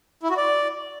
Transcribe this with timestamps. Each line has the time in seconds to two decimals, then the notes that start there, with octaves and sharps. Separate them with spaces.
0.23 E4
0.30 F#4
0.37 D5